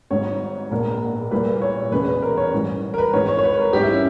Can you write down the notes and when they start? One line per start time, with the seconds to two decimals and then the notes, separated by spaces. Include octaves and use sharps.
0.11 G#1 G#2 G3 B3 C#5
0.71 A#1 A#2 G#3 B3 A#4
1.31 A#2 G3 A#3 E4 G#4 B4
1.62 C#5
1.92 E2 B2 G#3 C#4 G#4 B4
2.22 A#4
2.37 C#5
2.52 G#2 E3 G3
2.94 A#4
2.98 B4
3.12 G#1 G#2 E3 G#3 C#5
3.28 C#5
3.39 C#5
3.43 B4
3.54 B4
3.58 A#4
3.73 G#2 G3 B3 D#4 G4 G#4
3.83 E4
3.93 C#4